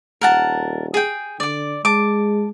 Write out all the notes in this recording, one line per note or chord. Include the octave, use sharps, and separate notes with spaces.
D#1 A#4 F#5 A5
G#4 G5
D3 D5 D6
G#3 A5 D6